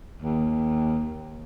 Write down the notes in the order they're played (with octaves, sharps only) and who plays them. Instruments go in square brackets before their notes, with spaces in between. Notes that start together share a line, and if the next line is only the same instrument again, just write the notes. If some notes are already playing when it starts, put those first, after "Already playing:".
[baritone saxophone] D#2